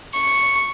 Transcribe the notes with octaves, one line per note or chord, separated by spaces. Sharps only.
C#6